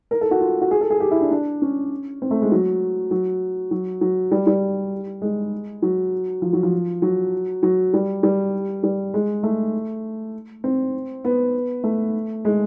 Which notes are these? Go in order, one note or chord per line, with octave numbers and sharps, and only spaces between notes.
A#4
A4
F#4
F4
F#4
G#4
A4
G#4
G4
E4
D4
D4
C#4
C4
A3
G#3
F#3
F#3
F#3
F#3
G3
G3
G#3
F#3
F3
F#3
F3
F#3
F#3
G3
G3
G3
G#3
A3
C4
B3
A3
G#3